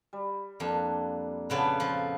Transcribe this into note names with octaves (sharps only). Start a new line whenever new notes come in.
G3
F2 A#3 D4
A#2 C#3 B3 A4 B4
F3